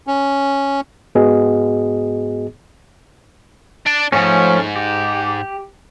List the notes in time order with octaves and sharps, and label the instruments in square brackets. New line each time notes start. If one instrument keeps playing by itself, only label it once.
[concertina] C#4
[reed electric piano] G#2 B3 F#4 G#4 D#5
[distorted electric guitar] D4 D5
[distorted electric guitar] G#2 [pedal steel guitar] F3 A3 C#4
[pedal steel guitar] G4